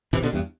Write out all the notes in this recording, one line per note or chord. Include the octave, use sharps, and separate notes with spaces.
C3 E3
B2 D3
E2 G2